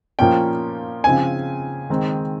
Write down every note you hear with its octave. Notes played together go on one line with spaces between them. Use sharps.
A#2 F3 A#3 C#4 G5
C#3 F3 C4 G#5
D#3 G#3 C4